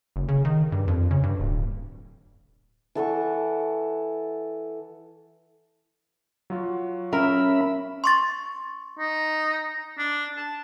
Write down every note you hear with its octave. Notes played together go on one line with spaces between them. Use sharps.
F#1
C#3
D#3
G2
F2
C#3
G2
D1
E3 A4 F#5 C#6
F#3 F4 F#4
C#4 A#4 E5 B5
C6 C#6 A6
D#4
D4
A5